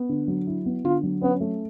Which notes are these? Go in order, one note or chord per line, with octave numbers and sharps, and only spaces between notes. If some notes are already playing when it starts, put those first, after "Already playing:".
Already playing: B3
D3
F#3
E4
B3
D3 F4
F#3
B3 C#4
A3